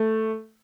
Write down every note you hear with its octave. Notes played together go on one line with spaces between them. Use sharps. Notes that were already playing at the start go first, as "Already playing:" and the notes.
Already playing: A3